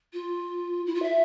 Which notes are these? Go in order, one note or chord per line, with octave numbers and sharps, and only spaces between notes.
F4
E4
F4
E5